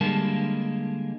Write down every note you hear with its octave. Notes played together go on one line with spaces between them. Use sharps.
D3 G3 G#3 A#3 A#4 A5